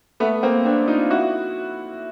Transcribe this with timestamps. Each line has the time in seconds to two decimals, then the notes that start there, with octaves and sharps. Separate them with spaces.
0.20 A3 B3
0.43 A#3 C4
0.65 C4 D4
0.88 D#4 F4
1.11 E4 F#4